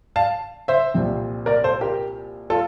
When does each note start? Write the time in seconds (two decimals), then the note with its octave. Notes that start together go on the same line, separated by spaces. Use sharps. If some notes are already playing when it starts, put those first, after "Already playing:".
0.16 F5 A5
0.68 C5 E5
0.94 C2 A#2 F3 C4
1.46 A#4 D5
1.64 A4 C5
1.81 G4 A#4
2.50 F4 A4